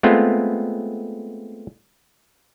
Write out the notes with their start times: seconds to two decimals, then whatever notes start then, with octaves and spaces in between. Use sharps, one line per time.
0.03 G#3 A3 B3 C4 F4